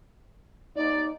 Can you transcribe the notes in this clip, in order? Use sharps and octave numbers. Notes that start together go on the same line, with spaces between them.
D#4 D5